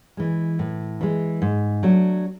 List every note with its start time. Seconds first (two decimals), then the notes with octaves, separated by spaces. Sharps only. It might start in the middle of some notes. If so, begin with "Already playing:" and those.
0.17 E3 G#3
0.59 A2
1.01 E3 G#3
1.42 G#2
1.83 F#3 A3 D4 F#4